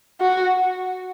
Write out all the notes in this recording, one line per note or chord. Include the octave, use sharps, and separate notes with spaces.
F#4